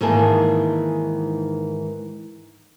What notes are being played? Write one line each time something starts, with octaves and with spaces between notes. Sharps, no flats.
G#2 D#3 E3 A#3 G#4 A5